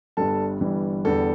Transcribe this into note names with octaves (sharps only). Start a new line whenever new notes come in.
G1 G2 G3 A4 A5
G1 G2 E3 G3
E2 D3 G3 A4